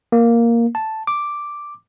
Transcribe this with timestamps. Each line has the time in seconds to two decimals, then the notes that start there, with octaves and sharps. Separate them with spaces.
0.12 A#3
0.75 A5
1.07 D6